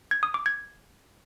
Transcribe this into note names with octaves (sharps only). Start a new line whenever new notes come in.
G#6
D#6
D6
G#6